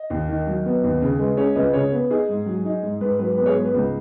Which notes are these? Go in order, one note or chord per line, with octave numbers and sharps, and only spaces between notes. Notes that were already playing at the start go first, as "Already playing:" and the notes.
Already playing: D#5
D#2
D#3
F#3
B3
D#2
C#3
G#3 B4
C#4 G#4 C#5
C#2 B4 D#5
C#3 G#4 C#5
B3 B4
D#4 G#4
G#2
F#3
D#4
G#2
G#2 B4
F#3 B4
B3 B4
G#4 C#5
G#2 B4
B4
C#2